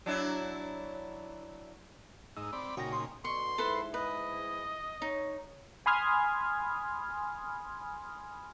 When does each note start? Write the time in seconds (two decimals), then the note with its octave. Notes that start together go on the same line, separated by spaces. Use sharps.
0.06 F#3 D4 E4
2.37 G#2 D#4 E6
2.53 C4 D5 B5
2.77 A#2 C#3 D#4 F#4 G5 A#6
2.93 C6
3.24 B2 D3 C6 C#6
3.58 G#2 E4 A4 B4 C5
3.94 B4 D#5
5.02 D#4 C#5
5.86 G#5 B5 C6 D#6 F6 G#6